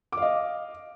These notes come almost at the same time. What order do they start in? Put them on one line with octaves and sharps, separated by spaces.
D6 F5 D#5